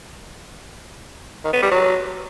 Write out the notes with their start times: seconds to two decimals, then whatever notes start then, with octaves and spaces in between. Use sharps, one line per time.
1.44 D#3
1.53 B3
1.62 G3
1.71 F#3